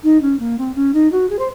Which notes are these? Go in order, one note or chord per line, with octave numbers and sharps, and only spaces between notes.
D#4
C#4
A#3
C4
C#4
D#4
F#4
G#4
C5